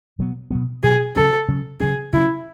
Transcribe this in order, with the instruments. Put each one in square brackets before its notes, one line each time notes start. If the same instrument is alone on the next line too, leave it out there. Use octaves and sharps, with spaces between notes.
[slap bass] B2 F#3 B3
B2 F#3 B3
[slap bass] B2 F#3 B3 [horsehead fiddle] G#4
[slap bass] C#3 F#3 C#4 [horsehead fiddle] A4
[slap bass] C#3 F#3 C#4
[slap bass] C#3 F#3 C#4 [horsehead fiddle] G#4
[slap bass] C#3 F#3 C#4 [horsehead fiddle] E4